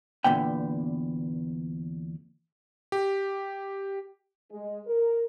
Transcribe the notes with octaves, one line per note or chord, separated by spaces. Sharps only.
E2 A#2 D3 B3 G5
G4
G#3
A#4